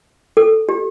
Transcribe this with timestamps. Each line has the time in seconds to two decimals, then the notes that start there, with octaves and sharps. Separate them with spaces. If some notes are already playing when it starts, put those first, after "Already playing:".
0.37 A4
0.69 G4